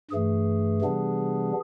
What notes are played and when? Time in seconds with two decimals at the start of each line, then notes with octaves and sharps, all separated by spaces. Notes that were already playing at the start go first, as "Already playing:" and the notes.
0.11 G2 E3 A3 G#4
0.82 C3 E3 G3 B3 D4